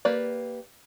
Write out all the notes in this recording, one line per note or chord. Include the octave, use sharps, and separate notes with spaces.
A#3 G4 B4 D5